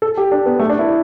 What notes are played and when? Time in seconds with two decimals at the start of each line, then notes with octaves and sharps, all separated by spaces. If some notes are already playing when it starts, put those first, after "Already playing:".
0.02 A4
0.17 G4
0.32 D4
0.46 B3
0.59 A3
0.70 D4
0.79 E4